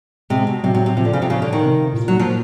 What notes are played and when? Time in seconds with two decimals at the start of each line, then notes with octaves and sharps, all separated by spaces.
0.30 C3 G#3
0.47 B2
0.63 C3 F#3
0.75 C3
0.86 C3
0.97 C3 F3
1.05 D3
1.13 C#3
1.22 C3
1.30 C#3
1.42 D3
1.53 D#3
1.63 C3
1.93 A2
1.97 A#2
2.08 F#3
2.19 F3